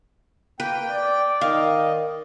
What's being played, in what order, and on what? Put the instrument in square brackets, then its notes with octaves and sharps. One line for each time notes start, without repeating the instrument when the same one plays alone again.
[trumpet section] A#3 [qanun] B4 [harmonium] G5
[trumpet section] D5
[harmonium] D#3 D#5 [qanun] F5